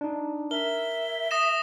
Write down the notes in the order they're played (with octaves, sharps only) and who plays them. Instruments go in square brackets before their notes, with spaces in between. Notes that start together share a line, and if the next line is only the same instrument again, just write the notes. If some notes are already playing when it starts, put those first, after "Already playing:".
[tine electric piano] D4 D#4
[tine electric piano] A#4 [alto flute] E5 [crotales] G7
[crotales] D#6 A#6 E7